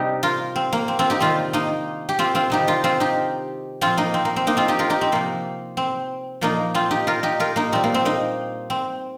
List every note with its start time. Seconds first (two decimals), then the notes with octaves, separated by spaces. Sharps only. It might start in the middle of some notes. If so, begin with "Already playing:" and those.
Already playing: C3 G3 D#4 G4
0.23 F4 A#4
0.56 C4
0.73 A#3
0.88 C4
0.99 C4 F4
1.10 D#4 G4
1.20 C3 D#3 G3 C4 F4
1.53 A#3 D#4
2.09 G4
2.19 C4 F4
2.35 C4 F4
2.50 C3 D#3 G3 D#4 G4
2.67 F4 A#4
2.84 C4 F4
3.00 D#4 G4
3.81 A#2 F3 C4 F4
3.97 A#3 D#4
4.14 C4
4.25 A#3
4.36 C4
4.47 A#3 D#4
4.57 C4 F4
4.68 D#4 G4
4.79 F4 A#4
4.90 D#4 G4
5.01 C4
5.12 C3 F3 A#3
5.77 C4
6.41 A#2 F3 A#3 D#4
6.74 C4 F4
6.91 D#4 G4
7.07 F4 A#4
7.23 D#4 G4
7.40 F4 A#4
7.56 A#3 D#4
7.72 A#2 G3 C4
7.84 A#3
7.94 C4
8.05 A#3 D#4
8.70 C4